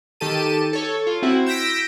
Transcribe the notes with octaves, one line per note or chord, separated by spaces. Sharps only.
D#3 G4 A4 A5 D#7
A4 C#5
F4
C4 E4 F#4
E6 G6 A#6 B6 D7